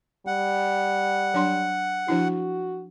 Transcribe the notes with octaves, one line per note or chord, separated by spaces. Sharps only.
G3 F#5
F#3 D4 C6
F3 D4 E4 F#4